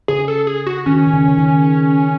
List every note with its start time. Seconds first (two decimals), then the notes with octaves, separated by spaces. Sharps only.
0.08 C#3 G#4
0.28 A4
0.47 G#4
0.66 F#4
0.86 D#3 C#4
1.07 D#3
1.13 C#3
1.29 C#3
1.38 D#3